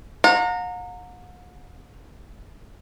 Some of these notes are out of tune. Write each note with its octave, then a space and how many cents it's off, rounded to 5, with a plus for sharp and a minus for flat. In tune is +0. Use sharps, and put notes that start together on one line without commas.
F#5 -45 A#5 -20